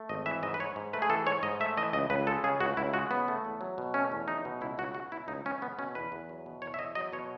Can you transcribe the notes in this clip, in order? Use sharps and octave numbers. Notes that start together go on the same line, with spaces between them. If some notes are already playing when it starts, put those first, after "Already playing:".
Already playing: A3
G#1 D#5
E3 E5
G#2 D#5
B4
G#2 C#5
G#2
A3 B4
G#4
E3 A4
G#2 C#5
G#2 D#5
A3 E5
E3 D#5
C#2 D#5
C#2 B4
G#3 A4
C#3 G#4
C#2 F#4
C#2 E4
G#3 F#4
C#3 B3
A3
E2
F#3
B2
A3 C#4
E2
F#3 D#4
B2
C#2 E4
C#2 F#4
G#3 F#4
B2 E4
C#2 D#4
C#2 C#4
G#3 B3
B2 C#4
E2 B4
E2
F#3
B2
E2 C#5
E5
E2 D#5
F#3 D#5
B2 C#5